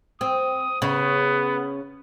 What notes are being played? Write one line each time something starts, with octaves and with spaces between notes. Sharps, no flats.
C4 D#6
C#3 B3